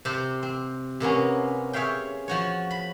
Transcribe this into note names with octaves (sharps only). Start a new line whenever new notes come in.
C3 C4 G4 C5
C4
C3 A#3 B3 C#4
G#4 C#5 E5 F5 G5
F3 F#4 C#5
B5